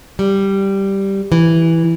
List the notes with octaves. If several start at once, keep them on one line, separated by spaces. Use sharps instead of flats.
G3
E3